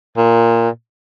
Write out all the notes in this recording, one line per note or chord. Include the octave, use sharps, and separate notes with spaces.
A#2